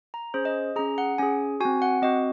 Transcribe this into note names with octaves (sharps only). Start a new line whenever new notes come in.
A#5
C#4 G#4 C5
D#5
C#4 G#4 A#5
F#5
C#4 G#4 G#5
C4 F#4 G#5
F#5
C4 F#4 D#5